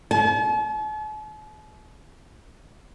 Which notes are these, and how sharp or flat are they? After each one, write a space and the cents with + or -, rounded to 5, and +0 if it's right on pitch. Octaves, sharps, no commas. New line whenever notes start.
A5 -45